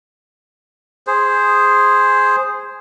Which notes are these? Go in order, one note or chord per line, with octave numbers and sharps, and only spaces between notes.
G#4 C5